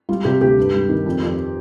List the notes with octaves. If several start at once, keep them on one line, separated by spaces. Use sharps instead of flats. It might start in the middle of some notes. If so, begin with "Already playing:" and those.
G3 F4
C3 G4
D2 G4
G2
G3
D#3
F2
F2